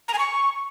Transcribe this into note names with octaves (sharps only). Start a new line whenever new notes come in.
A#5
G#5
C#6